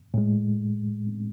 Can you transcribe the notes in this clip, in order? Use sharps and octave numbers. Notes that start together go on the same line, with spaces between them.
A2 G#3